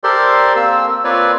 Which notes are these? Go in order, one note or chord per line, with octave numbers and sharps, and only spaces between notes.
G4 A4 A#4 C5 D5 C6
A#3 C4 E6
A#3 C4 F4 B4 C#5 D5